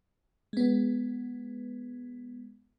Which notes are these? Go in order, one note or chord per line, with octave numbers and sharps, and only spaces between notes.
G#3 B3